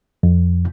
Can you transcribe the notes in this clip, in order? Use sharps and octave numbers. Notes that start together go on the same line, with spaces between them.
F2